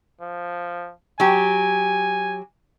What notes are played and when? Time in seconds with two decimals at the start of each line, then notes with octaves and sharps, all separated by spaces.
0.21 F3
1.20 F#3 G4 G#5